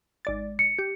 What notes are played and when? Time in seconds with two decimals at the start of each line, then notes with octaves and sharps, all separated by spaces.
0.25 G#1 D5 A6
0.59 C#7
0.79 G4